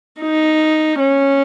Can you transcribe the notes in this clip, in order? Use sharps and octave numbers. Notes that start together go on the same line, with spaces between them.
D#4
C#4